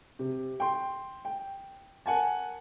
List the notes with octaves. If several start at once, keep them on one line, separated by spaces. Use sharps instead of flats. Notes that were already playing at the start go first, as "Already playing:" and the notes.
C3
G5 C6
G5
A#4 F#5 G#5 A5